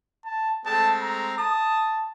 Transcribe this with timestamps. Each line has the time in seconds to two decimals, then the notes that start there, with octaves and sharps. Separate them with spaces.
0.25 A5
0.66 G#3 A3 C4 A5
1.02 A#5
1.38 A5 D#6